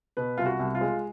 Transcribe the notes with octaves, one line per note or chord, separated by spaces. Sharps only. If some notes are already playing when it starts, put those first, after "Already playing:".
B2 B4
C2 F4
F#4
C2
F4
G#3